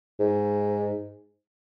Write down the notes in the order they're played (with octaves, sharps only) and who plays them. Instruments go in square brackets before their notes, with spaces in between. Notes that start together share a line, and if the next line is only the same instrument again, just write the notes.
[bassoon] G#2